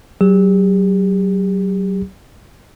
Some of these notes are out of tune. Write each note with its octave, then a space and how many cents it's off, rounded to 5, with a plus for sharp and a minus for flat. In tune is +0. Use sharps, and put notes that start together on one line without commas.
F#3 +35 G4 +45